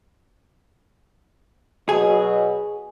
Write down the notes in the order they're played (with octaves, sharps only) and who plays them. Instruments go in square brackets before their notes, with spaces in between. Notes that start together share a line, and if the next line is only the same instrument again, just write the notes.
[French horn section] B2 F#3 [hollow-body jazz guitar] G#4